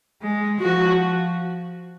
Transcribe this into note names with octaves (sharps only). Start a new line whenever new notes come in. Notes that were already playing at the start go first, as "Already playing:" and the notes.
G#3
F3 F#4